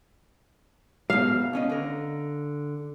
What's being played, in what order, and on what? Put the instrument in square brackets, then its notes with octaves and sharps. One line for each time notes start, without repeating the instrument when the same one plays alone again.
[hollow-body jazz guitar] G#2 B2 [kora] F5
[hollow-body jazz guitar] B2 C#4 D#5
D3 A#4